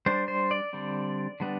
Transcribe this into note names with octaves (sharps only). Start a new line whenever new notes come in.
G3 D4 C5
C5
D5
D3 G3 C4
D3 G3 B3 D4